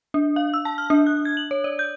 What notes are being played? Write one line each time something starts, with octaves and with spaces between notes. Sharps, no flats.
D4
F5
E6
A5
F6
D4
F#6
G#6
F#7
C#5
D5
G6